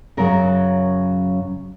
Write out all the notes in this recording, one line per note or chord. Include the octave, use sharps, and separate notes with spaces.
F#2 C#3 F#3 A#4